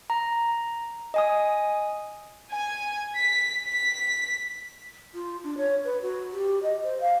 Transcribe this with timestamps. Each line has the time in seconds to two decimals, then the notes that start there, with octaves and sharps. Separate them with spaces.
0.10 A#5
1.14 D#5 G#5 D#6
2.51 G#5
3.17 B6
3.65 B6
5.14 F4
5.44 D4
5.57 C#5
5.84 B4
6.02 F#4
6.32 G4
6.63 D#5
6.83 C5
7.00 F5